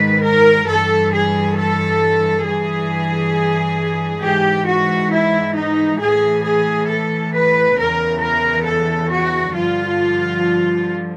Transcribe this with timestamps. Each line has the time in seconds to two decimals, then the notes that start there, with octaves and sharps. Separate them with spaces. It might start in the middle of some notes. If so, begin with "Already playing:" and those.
Already playing: G#2 D#3 B4
0.23 A#4
0.67 G2 E3 A4
1.12 G#4
1.57 A4
2.45 G2 E3 G#4
4.23 G#2 E3 G4
4.67 F#4
5.11 E4
5.56 D#4
6.00 A2 E3 G#4
6.44 G#4
6.89 A4
7.33 B4
7.77 E2 C#3 E3 A#4
8.22 A#4
8.66 A4
9.11 F#4
9.55 G2 D3 F3 F4